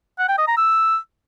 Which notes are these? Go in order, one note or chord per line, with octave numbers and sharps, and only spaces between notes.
F#5
G5
D#5
A#5
E6